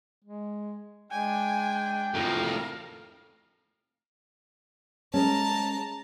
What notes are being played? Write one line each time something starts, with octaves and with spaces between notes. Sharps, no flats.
G#3
G#3 D4 G5 G#5
F2 A2 A#4 F5
G#3 C#4 A5 A#5